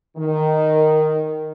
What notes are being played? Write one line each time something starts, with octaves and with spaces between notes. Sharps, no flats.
D#3